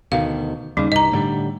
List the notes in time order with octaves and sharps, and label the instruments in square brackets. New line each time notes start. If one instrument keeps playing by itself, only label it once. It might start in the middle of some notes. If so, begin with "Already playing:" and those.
[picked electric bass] D2 B2 D#3 [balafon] F5
[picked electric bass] D#2 C#3 [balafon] G3 D#4
[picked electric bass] C2 G2 [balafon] D#5 A#5
[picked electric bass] A2 D3 G3